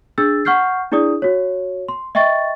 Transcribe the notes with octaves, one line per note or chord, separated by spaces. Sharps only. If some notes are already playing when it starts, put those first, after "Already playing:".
D4 G#4 E6 A6
F#5 C#6 F6 G6 C7
D4 E4 G#4 D5 D#6
F#4 C#5
C6
D#5 E5 G5 C#6 A6